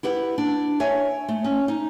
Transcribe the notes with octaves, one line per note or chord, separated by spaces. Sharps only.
E4 G4 B4 F#5
D4
C#5 E5 G#5
A3
C#4
D#4